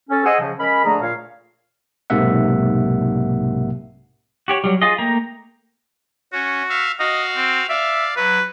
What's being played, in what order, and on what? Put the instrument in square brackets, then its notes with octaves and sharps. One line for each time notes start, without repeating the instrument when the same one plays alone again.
[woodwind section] C#4 A4
G#4 C5 D#5 F#5 G#5 E6
C#3 F3
G#3 C#4 A#4 B5
D3 F3 A3 G#4 A#5
A#2 C#5 F5
[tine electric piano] B1 G#2 C3 A#3 E5 F#5
[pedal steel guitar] F#4 G4 C#5
F#3 G3
F4 G#4 D#5
A3 A#3 G5 A#5
[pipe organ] C#4 [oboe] F#4
[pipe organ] E5 F5
[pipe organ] F#4 F5 [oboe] D#5
[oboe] C4
[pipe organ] D5 F5 [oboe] E5
[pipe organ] F#3 [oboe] B4